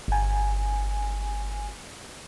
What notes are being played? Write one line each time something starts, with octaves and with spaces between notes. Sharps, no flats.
G1 G#5